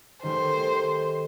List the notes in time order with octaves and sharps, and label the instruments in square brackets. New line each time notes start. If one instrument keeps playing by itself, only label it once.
[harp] D#3 G3 A3 [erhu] C5